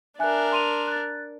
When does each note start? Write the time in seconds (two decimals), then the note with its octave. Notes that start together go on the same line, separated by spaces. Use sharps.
0.19 D4 A#4 E5 G#5 F#6
0.52 C6 D#7 F7
0.87 F#6 A6